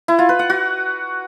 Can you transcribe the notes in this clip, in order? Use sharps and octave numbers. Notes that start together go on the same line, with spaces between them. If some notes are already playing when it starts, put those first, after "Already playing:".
E4
F4
B4
F#5
F#4